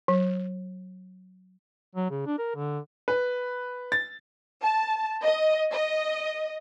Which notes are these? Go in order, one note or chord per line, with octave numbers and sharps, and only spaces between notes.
F#3
F#3
C#3
D4
A#4
D3
B4
A6
A5
D#5
D#5